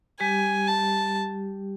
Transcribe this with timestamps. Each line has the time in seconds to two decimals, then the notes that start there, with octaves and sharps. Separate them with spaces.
0.20 G3 G4 G#5
0.68 A5